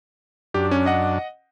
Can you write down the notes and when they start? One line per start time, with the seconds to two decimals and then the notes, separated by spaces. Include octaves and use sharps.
0.54 F#2 D4 G4
0.71 C#4
0.86 D#5 F#5